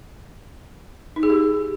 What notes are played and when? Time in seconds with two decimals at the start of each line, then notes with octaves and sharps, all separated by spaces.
1.16 D#4
1.23 G#4
1.30 G4